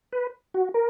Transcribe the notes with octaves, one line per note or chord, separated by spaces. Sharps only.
B4
F#4
A#4